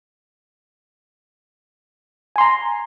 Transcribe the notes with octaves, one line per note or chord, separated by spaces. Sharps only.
G#5 A#5 C6